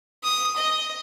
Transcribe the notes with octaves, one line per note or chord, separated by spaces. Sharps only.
D#6
D#5